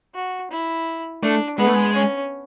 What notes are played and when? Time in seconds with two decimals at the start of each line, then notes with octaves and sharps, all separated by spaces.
0.15 F#4
0.51 E4
1.22 A3 D4
1.58 G#3 B3
1.67 A3
1.74 G#3
1.94 C#4